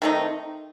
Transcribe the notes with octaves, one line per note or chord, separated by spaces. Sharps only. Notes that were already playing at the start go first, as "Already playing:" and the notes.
D#3 A3 C4 D#4